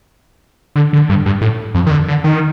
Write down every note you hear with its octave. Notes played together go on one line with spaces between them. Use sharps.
D3
D3
G2
G2
A2
F2
D#3
D3
D3
D#3